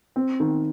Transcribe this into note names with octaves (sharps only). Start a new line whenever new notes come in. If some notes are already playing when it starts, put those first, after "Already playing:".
C4
D#3